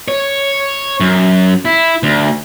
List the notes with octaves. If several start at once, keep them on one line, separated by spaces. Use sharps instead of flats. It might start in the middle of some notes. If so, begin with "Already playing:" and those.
C#5
F#2
E4
D2